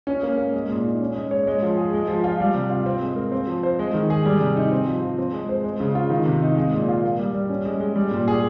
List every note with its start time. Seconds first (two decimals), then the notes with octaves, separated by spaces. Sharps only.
0.07 C#4
0.23 A#3
0.38 A#3
0.53 G#3
0.69 A#2
0.85 D#4
1.01 C#4
1.15 G#3
1.31 C#5
1.47 G#3
1.62 F3
1.78 G#4
1.94 G#3
2.08 F3
2.24 F4
2.40 G3
2.55 C3
2.70 F4
2.86 C4
3.02 G#3
3.16 A#4
3.32 C4
3.47 F3
3.63 C5
3.79 G#3
3.94 D#3
4.10 G#4
4.26 G3
4.40 C3
4.57 D#4
4.72 C4
4.87 F3
5.02 F3
5.18 C4
5.33 G#3
5.49 C5
5.64 G#3
5.80 C#3
5.95 F4
6.10 D#3
6.25 C3
6.42 D#4
6.57 G#3
6.73 A#2
6.88 F4
7.04 A#3
7.19 G3
7.34 G3
7.49 C#4
7.65 G#3
7.80 G#3
7.96 G3
8.11 A#2
8.28 G#4